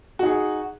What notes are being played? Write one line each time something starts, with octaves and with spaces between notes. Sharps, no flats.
D#4 F#4 G#4